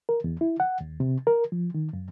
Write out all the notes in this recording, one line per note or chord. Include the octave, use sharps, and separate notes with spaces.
A#4
E2
E4
F#5
D#2
C3
A#4
F3
D#3
F#2